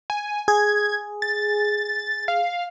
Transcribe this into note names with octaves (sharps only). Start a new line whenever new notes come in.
G#5
G#4 G#6
A6
F5